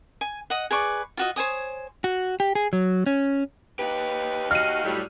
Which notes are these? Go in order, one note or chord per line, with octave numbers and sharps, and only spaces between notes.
G#5
D#5 F#5
G#4 B4 D5 C#6
F4 F#4 D#5
C5 C#5 G#5 D#6
F#4
G4
G#4
F#3
C#4
D#4 G4 B4
F#4 D#5 F5 F6 D#7
A2 F#3 G3